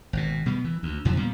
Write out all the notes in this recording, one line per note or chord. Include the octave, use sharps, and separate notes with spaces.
G#1 B2
B2 G3 B3
E3
D2
F2 D3 F3 F#3
A#2 G3 B3